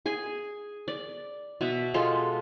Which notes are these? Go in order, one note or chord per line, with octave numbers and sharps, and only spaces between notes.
G#4 G#5
D5
B2 E5
G#3 F4 A4